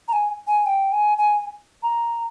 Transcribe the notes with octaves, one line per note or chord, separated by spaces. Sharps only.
A#5
G#5
G#5
G5
G#5
G#5
A#5